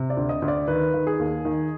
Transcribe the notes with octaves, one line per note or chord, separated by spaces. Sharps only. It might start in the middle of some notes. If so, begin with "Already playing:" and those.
Already playing: C3
D5
D2
D#5
D2
D5
D#3 B4
D#3
G#4
D#2
D#3